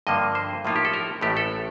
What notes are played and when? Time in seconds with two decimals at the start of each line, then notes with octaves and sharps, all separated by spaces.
0.07 G2 D3 F3 A#3 D#5
0.35 C5
0.65 A2 F3 A#3 D#4 F4
0.76 G4
0.85 A4
0.93 A#4
1.21 A1 A2 A3 G4
1.37 A4